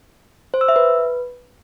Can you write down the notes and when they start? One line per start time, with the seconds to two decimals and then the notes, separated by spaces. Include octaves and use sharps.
0.54 C5
0.61 E6
0.69 E5
0.76 B4